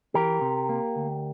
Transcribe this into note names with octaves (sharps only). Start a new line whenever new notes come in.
E3 G4 A#4
C3
A#3
D2